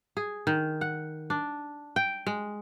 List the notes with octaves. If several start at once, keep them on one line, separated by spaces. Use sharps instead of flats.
G#4
D#3
F#5
D4
G5
G#3